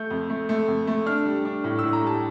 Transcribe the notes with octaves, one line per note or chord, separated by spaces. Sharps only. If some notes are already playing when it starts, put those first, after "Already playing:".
Already playing: A3 G6
F2
A3
A3
F2
A3
D4 F6
G3
D4
A2
A2 E6
A#5
G3 A5